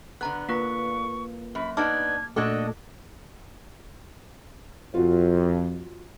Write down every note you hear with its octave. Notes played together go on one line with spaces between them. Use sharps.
D3 B3 A#5 F#6
A#3 F4 B4 C#6 B6
F#2 B5
B3 D4 D#4 A5 D6 F6 G#6
A#2 A3 D4 F#4 A4 D#5 D6 G#6
F2 F4 F#4